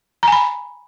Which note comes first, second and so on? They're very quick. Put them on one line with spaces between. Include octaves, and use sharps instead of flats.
A#5 G#5 B5